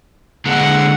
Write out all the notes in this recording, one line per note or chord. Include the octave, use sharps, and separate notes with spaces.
D3 G#3 F#5